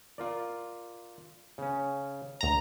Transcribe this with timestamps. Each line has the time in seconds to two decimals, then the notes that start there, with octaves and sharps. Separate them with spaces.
0.18 F4 A#4 D5
1.58 C#3 C#4
2.41 D2 A#5